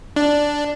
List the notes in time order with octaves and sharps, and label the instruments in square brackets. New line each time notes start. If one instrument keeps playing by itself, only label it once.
[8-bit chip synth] D4